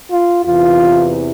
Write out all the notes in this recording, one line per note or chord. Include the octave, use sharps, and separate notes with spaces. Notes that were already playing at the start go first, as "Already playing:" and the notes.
F4
E2 C3 E3 F4